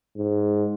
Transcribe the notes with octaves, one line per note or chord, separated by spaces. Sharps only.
G#2